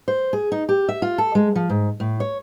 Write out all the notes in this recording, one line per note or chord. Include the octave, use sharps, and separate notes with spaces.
C5
G#4
D#4
G4
E5
F4
A4
G#3
F3
G#2
A2
C#5